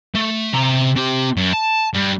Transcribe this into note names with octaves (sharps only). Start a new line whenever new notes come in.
A3
C3 A#5
C4 G4
F#2
A5
G2